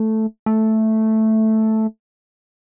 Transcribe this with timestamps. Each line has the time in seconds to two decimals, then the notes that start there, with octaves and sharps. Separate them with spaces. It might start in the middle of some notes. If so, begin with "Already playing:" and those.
Already playing: A3
0.46 A3